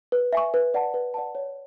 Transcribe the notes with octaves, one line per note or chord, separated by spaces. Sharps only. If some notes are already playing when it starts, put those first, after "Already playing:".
B4
E5 G#5 C#6
B4
D5 F#5 A5
B4
D5 F#5 A5
C#5